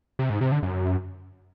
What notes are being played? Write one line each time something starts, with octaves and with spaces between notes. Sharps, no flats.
C3
G#2
C3
D3
F#2